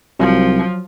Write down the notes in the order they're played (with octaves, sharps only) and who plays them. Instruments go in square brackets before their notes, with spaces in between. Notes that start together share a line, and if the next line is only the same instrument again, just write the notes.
[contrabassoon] C2 [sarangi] F3 [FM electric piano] F#3